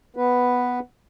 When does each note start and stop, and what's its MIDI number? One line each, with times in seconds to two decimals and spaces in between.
0.17 0.79 59
0.17 0.79 71